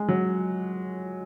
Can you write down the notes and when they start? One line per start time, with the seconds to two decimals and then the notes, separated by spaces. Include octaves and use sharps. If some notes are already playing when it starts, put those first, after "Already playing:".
Already playing: G#3
0.08 F#3